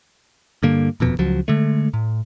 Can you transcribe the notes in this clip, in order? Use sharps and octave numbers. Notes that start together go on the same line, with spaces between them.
G2 D3 A#3
D#1 F2 B2
C#2 F3 F#3
D3 G#3 A3
A2